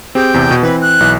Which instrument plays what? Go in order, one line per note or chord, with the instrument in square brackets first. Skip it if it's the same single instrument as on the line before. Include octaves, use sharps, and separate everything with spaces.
[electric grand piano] C4 G4 G#4 [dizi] G5
[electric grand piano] E2 C3
B2
[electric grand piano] E3 C4 [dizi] B4
[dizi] F#6
[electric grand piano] B1 E3